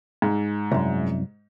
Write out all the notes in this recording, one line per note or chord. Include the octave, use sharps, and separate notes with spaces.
G#2
C2 F#2